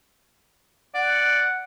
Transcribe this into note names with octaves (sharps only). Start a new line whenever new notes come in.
D5 F#5